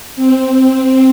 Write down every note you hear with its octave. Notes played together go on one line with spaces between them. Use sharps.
C4